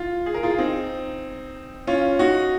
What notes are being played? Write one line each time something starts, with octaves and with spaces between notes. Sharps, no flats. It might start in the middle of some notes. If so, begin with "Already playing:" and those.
Already playing: F4
G#4
A#4
F4 G#4
C4 D#4
C#4 F4
D#4 F#4